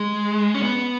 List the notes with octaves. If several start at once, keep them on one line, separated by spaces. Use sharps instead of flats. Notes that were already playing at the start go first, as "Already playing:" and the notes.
Already playing: G#3
C#4
B3